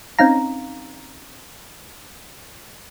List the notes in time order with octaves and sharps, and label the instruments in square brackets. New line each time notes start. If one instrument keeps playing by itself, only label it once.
[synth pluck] C4 C#4 D#4 F5 A#5